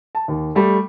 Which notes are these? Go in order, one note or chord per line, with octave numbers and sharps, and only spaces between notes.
A5
D#2
G3 A3